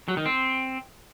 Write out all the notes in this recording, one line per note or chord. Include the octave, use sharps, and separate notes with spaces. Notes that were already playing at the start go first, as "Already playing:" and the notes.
F#3
D#3
C4